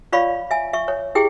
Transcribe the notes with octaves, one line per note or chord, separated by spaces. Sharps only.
F4 C#5 D5 F5 B5 C#6
E5 G#5
E5 C#6
C#5
E4 G4 G#4 G5